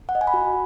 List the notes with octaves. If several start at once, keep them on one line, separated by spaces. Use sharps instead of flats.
F#5
D#5
G#5
B5
F#4